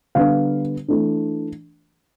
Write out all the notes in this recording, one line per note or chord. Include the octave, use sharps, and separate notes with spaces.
D3 G3 B3 D4 F5
E3 A3 D4